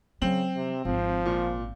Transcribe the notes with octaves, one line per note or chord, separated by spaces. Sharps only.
C#3 F#3 C4 F#7
C3
G#1 F3
A#2